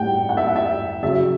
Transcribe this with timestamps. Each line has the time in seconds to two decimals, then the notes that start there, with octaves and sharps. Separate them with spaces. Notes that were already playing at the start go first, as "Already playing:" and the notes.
Already playing: A2 G3 F#5 G5
0.29 F#5
0.37 E5
0.47 F#5
0.56 E5
1.02 C#3 F#3 E5